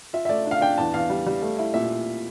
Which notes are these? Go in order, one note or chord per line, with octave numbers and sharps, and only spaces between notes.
F4 E5
E5
A3 D5
D4
F5
D4 G5
E2 A5
E2 F5
G3
G3
A3
E4
A#2 E5